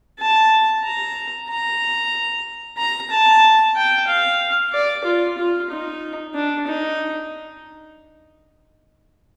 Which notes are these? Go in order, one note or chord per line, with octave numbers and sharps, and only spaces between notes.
A5
A#5
A#5
A#5
A5
G5
F5
D5
F4
F4
D#4
D4
D#4